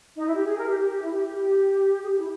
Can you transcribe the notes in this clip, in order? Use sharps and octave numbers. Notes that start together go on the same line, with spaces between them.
D#4
E4
G4
G#4
A#4
G4
G4
G4
E4
G4
G4
G4
G#4
G4
E4